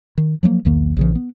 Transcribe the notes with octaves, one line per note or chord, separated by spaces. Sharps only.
D#3
F3 F#3 G#3 A#3
B1 E2 D#3 A#3
A#1 C#3 E3
B3